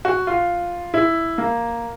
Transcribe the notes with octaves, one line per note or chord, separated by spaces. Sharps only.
F#4
F4
E4
A#3